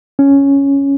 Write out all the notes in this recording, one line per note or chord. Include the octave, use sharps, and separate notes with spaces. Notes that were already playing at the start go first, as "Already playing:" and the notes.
C#4